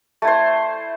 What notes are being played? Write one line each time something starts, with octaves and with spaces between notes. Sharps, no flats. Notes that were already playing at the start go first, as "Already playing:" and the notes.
A3 E4 C5